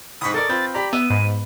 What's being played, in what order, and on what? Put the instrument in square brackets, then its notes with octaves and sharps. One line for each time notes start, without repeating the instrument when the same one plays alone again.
[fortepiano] C2 G#2 [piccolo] B5 [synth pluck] C#6 D#6
[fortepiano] A4 A#4 D5 [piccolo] A6
[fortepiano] C4 F4 B4
[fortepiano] G4 D5 A#5 [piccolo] B5
[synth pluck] B3 [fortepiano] E5 [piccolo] D#7
[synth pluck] G#2 [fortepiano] B4